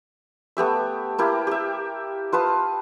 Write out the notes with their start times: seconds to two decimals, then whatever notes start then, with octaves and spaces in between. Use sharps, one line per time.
0.57 A3 B3 G4 E5
1.18 A#3 E4 G4
1.47 G4 E5
2.33 F4 B4 A5 D#6